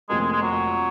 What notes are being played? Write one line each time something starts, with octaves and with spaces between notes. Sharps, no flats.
F1 F2 F3 G#3 A#3
G#3
G#3
F#3